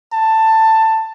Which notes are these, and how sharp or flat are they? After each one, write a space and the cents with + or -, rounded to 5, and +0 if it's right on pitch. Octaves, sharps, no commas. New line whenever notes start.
A5 +15